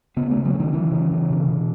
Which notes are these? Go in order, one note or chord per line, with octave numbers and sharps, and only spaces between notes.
C#3 B3
C#3 A3
F#3
C#3
D#3
C#3 E3
C#3
C#3
B2
B2